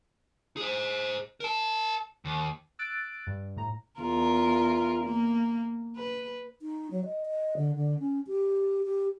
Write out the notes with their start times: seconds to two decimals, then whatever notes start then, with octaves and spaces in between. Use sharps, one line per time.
0.57 G#4 C5
1.40 A#4 A5
2.25 D#2
2.79 E6 F#6 A6 D7
3.27 G2
3.57 A2 A#5
4.00 E2 F4 A#4
5.05 A#3
5.96 B4
6.62 D#4
6.91 F#3
7.05 D#5
7.26 D#5
7.57 D3
7.75 D3
7.99 C#4
8.27 G4
8.83 G4